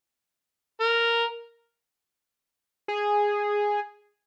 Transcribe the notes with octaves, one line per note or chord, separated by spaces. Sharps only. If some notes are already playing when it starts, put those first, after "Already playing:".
A#4
G#4